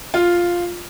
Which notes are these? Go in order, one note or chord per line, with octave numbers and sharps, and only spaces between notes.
F4